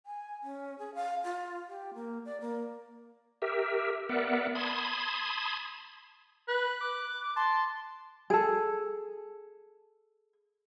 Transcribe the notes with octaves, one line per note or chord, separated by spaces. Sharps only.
G#5
C#4
G#4
F5
F4
G4
A#3
D5
A#3
G4 A#4 E5
B3 A#4 D5 E5 F#5
A5 B5 C6 D#6 G#6
B4 F#6
D6
A5 C6
G#4 A4